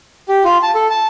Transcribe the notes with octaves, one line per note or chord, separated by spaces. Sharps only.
G4
F4
A5
A4
A5